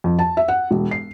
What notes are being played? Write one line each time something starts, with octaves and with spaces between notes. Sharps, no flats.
F2
A5
E5
F#5
E1
C7